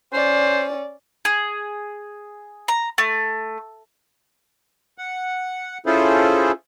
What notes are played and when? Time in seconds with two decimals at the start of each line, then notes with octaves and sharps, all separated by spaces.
0.13 C#4 C5 D5
1.25 G#4
2.68 A#5
2.98 A3
4.98 F#5
5.86 C#4 E4 F4 G#4 A4 C5